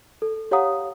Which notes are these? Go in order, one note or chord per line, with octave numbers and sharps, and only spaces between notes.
A4
G4 C#5 F5 F#5 A#5 D#6